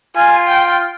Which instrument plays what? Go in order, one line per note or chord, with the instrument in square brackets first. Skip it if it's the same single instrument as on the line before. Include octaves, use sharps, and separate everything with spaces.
[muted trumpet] F4 [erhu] G#5
[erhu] G5